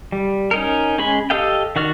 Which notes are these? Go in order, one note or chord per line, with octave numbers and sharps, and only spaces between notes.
G3
C#4 D#4 A#4
G#3 C#4 G#4 B5
G4 A4 D#5 F5 G5
D#3 F#4 D5 F6